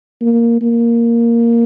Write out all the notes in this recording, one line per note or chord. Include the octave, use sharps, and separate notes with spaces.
A#3
A#3